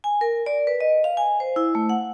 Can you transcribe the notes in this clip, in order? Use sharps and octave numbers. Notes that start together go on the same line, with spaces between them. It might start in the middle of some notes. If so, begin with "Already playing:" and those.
G#5
A#4
D5
B4
D#5
F5
G#5
C5
E4
A3
F#5